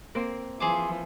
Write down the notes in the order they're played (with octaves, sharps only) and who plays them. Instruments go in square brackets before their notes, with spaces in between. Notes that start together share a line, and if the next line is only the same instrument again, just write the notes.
[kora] A#3 C4
[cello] E3 F3 [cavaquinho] G#4 C5 D6